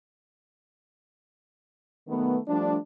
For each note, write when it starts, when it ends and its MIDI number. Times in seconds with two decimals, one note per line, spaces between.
2.08 2.37 51
2.08 2.37 54
2.08 2.37 57
2.08 2.37 59
2.48 2.76 53
2.48 2.76 55
2.48 2.76 57
2.48 2.76 62